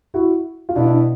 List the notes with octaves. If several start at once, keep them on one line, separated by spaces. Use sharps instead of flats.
E4 F#4
F4
B2 D4 E4
D4 E4